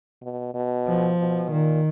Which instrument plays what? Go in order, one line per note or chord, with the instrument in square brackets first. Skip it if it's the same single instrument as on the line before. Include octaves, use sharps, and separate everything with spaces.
[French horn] B2
B2
[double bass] F3
[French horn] B2
[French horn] A#2 [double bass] D#3